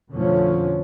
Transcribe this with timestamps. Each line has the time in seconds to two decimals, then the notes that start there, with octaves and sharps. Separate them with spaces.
0.12 F2 B2 D3 F3 A3 C#4